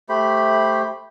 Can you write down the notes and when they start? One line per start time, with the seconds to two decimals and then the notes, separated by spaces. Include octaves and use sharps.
0.09 A3 G4 C5 B5